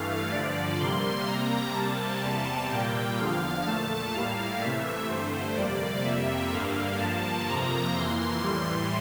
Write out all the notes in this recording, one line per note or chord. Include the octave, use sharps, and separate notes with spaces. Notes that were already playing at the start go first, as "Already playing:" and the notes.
Already playing: G2 E3 A3 F5
G2 D3 F3 D5
C3 G3 A#3 C6
C3 G3 A#3 A#5
C3 G3 A#3 A5
E2 C3 G3
A#2 G3 A#3 G5
E2 D3 F3 F5
A#2 A3 A5
A2 G3 A#3 F5
C3 E3 A3 E5
G2 D3 A3 C5
F2 C3 G3 A#3 D5
F2 C3 G3 A#3 E5
G2 D3 G3 A#3 F5
G2 F3 A#3 A5
F2 C3 F3 A#3 A#5
F2 E3 A#3 C6
A2 E3 G3